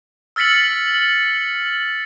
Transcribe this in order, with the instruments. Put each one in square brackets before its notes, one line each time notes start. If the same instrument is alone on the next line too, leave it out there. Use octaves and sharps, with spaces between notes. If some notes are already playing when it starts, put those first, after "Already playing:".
[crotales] E6 F6 A6 B6 C#7 F#7